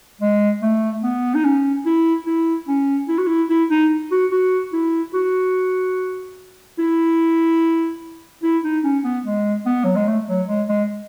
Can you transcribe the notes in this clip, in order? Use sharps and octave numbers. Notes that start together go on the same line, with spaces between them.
G#3
A3
B3
D#4
C#4
E4
E4
C#4
E4
F#4
E4
E4
D#4
F#4
F#4
E4
F#4
E4
E4
D#4
C#4
B3
G#3
B3
F#3
G#3
A3
F#3
G#3
G#3